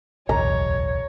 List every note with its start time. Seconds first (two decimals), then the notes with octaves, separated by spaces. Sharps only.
0.29 D1 B1 E2 C#5 A#5